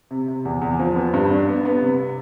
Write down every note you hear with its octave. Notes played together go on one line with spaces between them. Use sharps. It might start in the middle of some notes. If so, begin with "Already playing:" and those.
C3
C3
E2
E2
F3
B3
G2
D4
B3
B3
C3